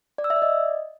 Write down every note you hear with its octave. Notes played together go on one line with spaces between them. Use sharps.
D5
E6
E5
D5
D#5